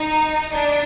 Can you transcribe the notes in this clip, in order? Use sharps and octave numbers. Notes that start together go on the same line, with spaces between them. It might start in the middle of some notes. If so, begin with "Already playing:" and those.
Already playing: D#4
D4